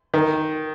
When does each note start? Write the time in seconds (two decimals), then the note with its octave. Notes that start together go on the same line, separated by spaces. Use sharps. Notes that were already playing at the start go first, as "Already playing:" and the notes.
0.14 D#3